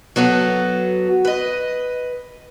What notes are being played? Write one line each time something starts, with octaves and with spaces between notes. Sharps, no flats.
F#3 B3 F#4 A4
B4 D#5